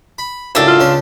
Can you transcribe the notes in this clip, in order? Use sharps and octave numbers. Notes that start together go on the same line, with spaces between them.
B5
C#2 F#2 A2 D4 A4
F4
C#2 C#4 C6